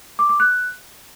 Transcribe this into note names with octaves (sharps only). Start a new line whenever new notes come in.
D6
D6
F#6